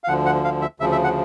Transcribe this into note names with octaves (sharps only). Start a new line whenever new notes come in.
F5
D2 D3 F3 F#5
F#5
F5
E5
D2 C#3 F3 E5
E5
F#5